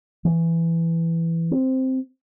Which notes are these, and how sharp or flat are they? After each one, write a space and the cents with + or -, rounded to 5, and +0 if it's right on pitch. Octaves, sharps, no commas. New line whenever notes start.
E3 +10
C4 +0